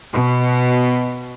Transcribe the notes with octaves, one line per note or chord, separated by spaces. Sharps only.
B2